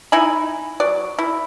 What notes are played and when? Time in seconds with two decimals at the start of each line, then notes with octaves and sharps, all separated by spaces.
0.12 D#4 E4 G#5 B5
0.80 F#3 D5
1.19 E4